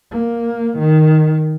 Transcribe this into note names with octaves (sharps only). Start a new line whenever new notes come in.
A#3
D#3